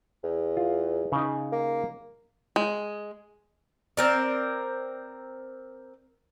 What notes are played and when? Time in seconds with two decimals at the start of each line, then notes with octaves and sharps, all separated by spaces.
0.23 E2
0.57 F4
1.12 C#3 D#4
1.52 A#3
2.56 G#3
3.97 C4 A#4 D5